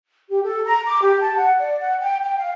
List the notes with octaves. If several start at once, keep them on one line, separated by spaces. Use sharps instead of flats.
G4
A4
A#5
D6
G4
A5
F#5
D5
F#5
G5
G5
F5